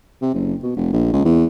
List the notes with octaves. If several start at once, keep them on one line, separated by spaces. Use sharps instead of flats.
C3
F#1
B2
F1
A#1
C#2
E2